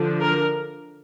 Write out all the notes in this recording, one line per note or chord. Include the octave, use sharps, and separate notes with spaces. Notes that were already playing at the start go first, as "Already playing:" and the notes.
Already playing: D3 F3 D4
A#4